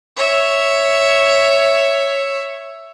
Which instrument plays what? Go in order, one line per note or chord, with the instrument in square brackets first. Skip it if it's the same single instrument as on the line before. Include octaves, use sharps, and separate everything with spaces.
[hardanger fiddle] C#5 E5